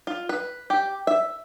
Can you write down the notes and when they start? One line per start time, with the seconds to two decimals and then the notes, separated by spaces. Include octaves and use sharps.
0.07 F4
0.29 B4
0.70 G4
1.07 E5